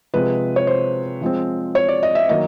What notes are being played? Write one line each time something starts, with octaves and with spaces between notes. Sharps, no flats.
C3 F3 G#3 B4
C#5
C5
F3 G#3 C4
C#5
D5
D#5
E5
D#3 F#3 A#3 D#4 D#5